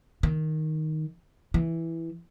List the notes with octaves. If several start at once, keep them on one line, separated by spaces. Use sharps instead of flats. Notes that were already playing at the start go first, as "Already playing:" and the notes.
D#3
E3